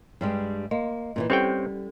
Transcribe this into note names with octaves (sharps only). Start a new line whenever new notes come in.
G2 G3 G#3
A#3 D#5
A#2 D3 E3
G3 C4 C#4 G4 A4 C#5 G5